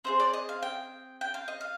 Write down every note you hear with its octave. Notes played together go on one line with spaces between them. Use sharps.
C4 D#4 G#4 C5
D5
D#5
F5
G5
G5
F5
D#5
F5